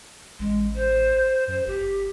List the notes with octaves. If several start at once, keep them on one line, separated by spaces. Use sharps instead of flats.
A1 G#3
C5
F#2 C5
G1 G4